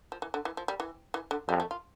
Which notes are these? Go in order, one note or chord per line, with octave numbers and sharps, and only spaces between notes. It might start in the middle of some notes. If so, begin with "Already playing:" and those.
F3
E3
D3
E3
F3
G3
E3
E3
D3
F2 G3
A3
F4